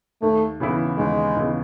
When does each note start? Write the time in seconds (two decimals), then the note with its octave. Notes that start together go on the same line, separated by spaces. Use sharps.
0.22 D#2 A3
0.60 C#3 E3 B3 E4
0.98 D#2 G#3
1.36 C#3 E3 B3 E4